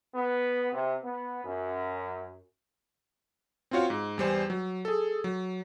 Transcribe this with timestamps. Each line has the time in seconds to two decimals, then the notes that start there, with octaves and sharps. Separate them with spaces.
0.14 B3
0.72 C3
1.03 B3
1.44 F#2
3.71 C4 C#4 F4 F#4 C#5 F5
3.90 G#2
4.18 E2 G3 C5 G#5
4.50 F#3
4.85 G#4 A4
5.24 F#3